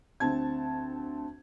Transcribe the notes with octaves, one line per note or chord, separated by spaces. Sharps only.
D2 C4 A5 G#6